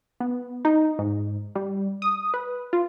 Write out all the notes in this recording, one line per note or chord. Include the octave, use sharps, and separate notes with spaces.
B3
D#4
G#2
G3
D#6
B4
F4